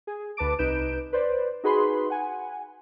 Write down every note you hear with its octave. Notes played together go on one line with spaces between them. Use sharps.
G#4
D2 B4 A5 D6 D7
C2 D#4 B4 G6 D7 E7
B4 C5 D5
D#4 F#4 G#4 B4 B5 C6
F#5 G#5